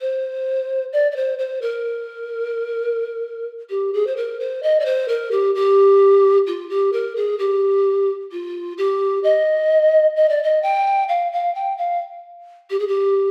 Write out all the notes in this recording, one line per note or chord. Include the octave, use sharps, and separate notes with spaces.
C5
D5
D5
C5
C5
A#4
G4
G#4
C5
A#4
C5
D#5
D5
C5
A#4
G4
G4
F4
G4
A#4
G#4
G4
F4
G4
D#5
D#5
D5
D#5
G5
F5
F5
G5
F5
G4
G#4
G4